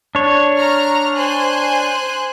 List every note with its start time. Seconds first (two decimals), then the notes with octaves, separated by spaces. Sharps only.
0.15 D4 C#5
0.56 A#5 C#6 F6
1.16 C5 G#5 F#6